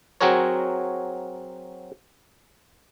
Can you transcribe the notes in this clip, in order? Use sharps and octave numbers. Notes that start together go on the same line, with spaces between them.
F#3 C4 F#4 G#4 A#4 C#5